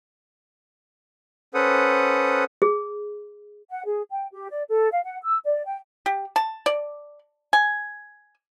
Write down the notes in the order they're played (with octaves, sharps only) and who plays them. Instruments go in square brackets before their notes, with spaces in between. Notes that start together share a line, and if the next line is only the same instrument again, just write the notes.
[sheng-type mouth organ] C#4 A4 B4 C5 F#5 D#6
[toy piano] G#4
[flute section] F#5
G#4
G5
G4
D5
A4
F5
F#5
E6
D5
G5
[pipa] G4
A5
D5
G#5